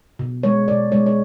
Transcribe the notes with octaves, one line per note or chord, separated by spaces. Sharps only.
B2
G#3 C#5
B2 D5
G#3 C#5
C#5